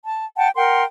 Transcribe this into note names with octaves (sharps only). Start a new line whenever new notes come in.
A5
F#5 G5 A5
A#4 F#5 G5 C6